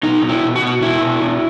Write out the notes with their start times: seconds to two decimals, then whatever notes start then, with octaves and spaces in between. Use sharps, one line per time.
0.03 B2 D#4
0.22 B2
0.29 E4
0.43 B2
0.56 F#4
0.62 B2
0.81 B2 E4
1.01 B2
1.21 B2